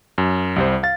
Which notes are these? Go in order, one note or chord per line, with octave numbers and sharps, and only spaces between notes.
F#2
C2 G3 C5
F5 A6